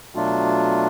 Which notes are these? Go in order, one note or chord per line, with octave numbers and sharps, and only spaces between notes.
B2 F#3 A3 D4 F4